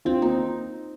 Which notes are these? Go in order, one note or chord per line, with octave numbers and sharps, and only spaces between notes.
C4 F4
A#3 D#4